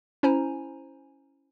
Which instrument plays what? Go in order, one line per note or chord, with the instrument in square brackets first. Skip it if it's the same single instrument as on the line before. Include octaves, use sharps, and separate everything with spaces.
[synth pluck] C#4 E4 C5 G#5 A#5